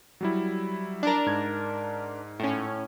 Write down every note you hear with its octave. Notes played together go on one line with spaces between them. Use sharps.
F#3 G3 E4
D4 A#4
G#2 G#6
A2 C#4